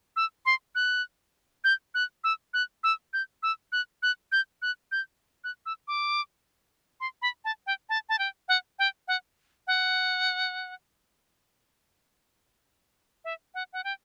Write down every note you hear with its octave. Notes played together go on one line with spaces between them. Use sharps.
E6
C6
F#6
G6
F#6
E6
F#6
E6
G6
E6
F#6
F#6
G6
F#6
G6
F#6
E6
D6
C6
B5
A5
G5
A5
A5
G5
F#5
G5
F#5
F#5
E5
F#5
F#5
G5